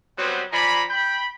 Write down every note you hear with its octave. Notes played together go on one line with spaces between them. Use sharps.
F#3 G3 B3 C4 B4 C5
F3 D5 G#5 A#5 B5
G5 B5